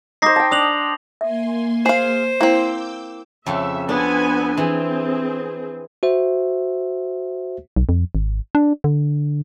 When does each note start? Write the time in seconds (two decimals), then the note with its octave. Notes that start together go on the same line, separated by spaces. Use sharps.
0.22 D#4 C5 D6 A#6 C7
0.36 G5 A5
0.52 D4 D#6 F7 F#7
1.21 A#3 E5 G#5 C6
1.86 G#4 C5 F5
2.41 A#3 C4 E4 D6 E6 G6
3.46 F2 C#3 E5
3.89 B3 C4 D4 G#5
4.57 E3 C4 G#4
6.03 F#4 C5 E5
7.76 B1
7.89 F2
8.15 G#1
8.55 D4
8.84 D3